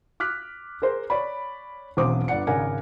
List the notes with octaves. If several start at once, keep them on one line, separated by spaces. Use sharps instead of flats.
D6 F6 F#6 B6
G#4 A#4 C5
C#5 D5 B5
E1 B1 C4 C5 D6 D#6
G1 D5 F#5 C#7
G#1 C#3 A#4 D5 F#5 G#5